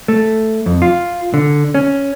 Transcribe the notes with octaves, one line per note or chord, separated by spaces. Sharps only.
A3
F2
F4
D3
C#4